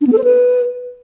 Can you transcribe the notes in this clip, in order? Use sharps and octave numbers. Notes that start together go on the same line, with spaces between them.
D4
B3
A4
C5
B4